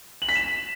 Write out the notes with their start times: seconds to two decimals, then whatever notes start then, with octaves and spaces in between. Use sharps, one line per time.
0.22 F#7
0.29 B6
0.35 E7